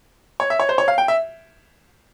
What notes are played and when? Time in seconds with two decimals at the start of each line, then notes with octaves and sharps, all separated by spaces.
0.40 C#5
0.50 E5
0.60 C#5
0.69 C5
0.78 C#5
0.88 F5
0.98 G5
1.08 E5